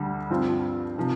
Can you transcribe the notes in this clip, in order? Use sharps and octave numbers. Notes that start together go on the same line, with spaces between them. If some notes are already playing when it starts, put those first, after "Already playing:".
Already playing: D2 D3 G3
G2 F3 C4 F4
C3 F3